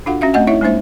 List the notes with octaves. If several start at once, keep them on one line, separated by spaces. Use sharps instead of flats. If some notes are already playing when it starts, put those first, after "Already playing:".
D4 F4 F#4 A4 F5 F#5
C#4 F#4 E5 F5
A3 C4 D#5 F#5 G#5
D#4 E4 C#5 E5
G#3 A#3 D4 D#4 C5 E5